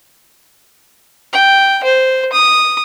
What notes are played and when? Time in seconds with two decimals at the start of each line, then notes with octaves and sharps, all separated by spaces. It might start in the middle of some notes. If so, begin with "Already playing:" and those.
1.33 G5
1.84 C5
2.33 D#6